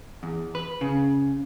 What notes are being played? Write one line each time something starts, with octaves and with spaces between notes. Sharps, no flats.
E2
B4
C#3